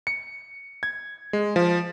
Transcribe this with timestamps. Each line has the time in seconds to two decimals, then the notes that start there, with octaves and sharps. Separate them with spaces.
0.07 C#7
0.83 G#6
1.33 G#3
1.56 F3